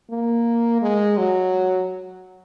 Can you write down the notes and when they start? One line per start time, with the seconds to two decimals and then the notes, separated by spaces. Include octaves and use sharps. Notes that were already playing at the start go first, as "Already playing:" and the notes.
0.11 A#3
0.82 G#3
1.18 F#3